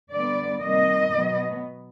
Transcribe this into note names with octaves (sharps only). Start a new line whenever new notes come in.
D3 G3 B3 D5
C3 D#3 G3 A#3 D#5
B2 F#3 B3